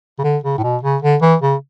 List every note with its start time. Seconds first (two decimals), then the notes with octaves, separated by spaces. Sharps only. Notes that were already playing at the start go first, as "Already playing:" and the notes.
0.19 C#3
0.23 D3
0.43 C#3
0.58 A2
0.63 B2
0.83 C#3
1.02 D3
1.21 E3
1.41 C#3